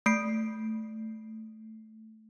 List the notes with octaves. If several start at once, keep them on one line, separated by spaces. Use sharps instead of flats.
A3 C7 D7